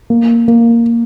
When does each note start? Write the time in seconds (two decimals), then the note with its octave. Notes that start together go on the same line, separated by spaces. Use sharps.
0.10 A#3
0.48 A#3